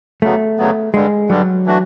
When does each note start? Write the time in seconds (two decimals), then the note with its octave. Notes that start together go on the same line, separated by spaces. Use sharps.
0.22 D2 C#3 F#3 A3 B3
0.58 D2 C#3 F#3 B3
0.94 G2 D3 G3 G#3
1.30 G2 D3 F#3 G3
1.66 E3 A3 D4 F#4